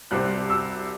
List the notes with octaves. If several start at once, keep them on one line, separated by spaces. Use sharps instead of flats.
C2 C3 G3 C4 F#6
E6